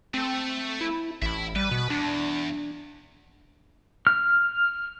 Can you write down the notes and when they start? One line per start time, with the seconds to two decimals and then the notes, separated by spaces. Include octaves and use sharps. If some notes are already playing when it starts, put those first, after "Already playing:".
0.14 A3 C4 A4
0.81 E4
1.22 A1 E5 B5
1.56 G3 B4
1.71 B2
1.90 E2 D4
4.07 F6